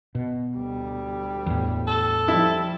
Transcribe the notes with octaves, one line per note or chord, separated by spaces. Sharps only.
B2
D2 G3
E2 A2
A4
F3 G3 E4